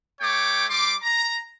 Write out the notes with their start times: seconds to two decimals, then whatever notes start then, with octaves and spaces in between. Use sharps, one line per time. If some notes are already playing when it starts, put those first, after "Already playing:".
0.21 A3 C#5 G5 D6
0.70 G3 C6 D6
1.03 A#5